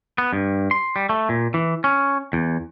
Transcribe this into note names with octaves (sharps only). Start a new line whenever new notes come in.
B3
G2
C6
G3
A3
A#2
E3
C#4
E2